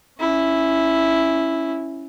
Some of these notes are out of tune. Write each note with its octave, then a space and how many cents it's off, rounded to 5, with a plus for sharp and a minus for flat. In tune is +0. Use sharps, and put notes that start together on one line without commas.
C#4 +0 E4 +0